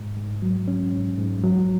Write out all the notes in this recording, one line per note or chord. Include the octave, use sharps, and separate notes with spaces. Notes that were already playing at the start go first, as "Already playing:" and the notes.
Already playing: G#2
G#2
F#3
C#4
G#2
G#2
F#3